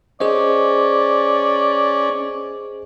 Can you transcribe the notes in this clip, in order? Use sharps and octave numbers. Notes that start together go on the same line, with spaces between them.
C#4 G#4 C5 D5 D#5